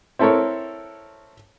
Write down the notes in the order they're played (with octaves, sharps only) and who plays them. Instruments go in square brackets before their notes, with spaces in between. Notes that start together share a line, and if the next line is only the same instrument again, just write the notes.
[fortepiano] C4 E4 A4 A#4 C#5